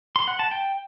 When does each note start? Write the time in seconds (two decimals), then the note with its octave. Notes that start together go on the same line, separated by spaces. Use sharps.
0.16 C6
0.28 F#5
0.39 A5
0.51 G5